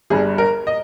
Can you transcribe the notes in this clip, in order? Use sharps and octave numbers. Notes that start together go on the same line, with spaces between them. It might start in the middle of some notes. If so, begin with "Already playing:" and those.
G1 G2 G3 G#4
A#4
D#5